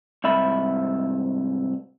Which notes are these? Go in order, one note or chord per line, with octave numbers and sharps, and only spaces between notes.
C2 G#2 E5 B5